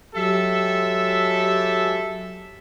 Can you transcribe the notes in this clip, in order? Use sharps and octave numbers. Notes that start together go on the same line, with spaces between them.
F#3 G#3 G4 A4 E5